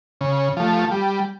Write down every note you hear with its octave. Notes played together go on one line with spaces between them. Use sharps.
C#3
F3 A3
G3